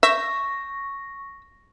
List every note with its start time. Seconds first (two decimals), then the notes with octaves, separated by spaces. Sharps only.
0.03 E5 C#6 A#6